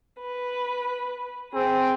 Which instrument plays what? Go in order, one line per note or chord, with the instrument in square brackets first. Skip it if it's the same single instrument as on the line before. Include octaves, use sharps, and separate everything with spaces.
[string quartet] B4
[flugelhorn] C4 [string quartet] G#4